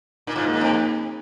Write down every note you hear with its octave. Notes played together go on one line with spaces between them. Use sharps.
A#2 D#4
G#2 F4
A#3 D#4
G#2
F2